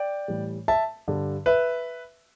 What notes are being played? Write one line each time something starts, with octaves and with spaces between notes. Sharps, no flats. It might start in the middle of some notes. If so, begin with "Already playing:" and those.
Already playing: D5 G5
A2 E3 G3
E5 A5
G2 D3 G3
B4 E5